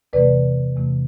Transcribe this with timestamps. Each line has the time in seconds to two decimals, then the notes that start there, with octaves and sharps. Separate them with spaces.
0.13 E2 C3 E3 A3 B4 D5
0.76 E2 C3 E3 A3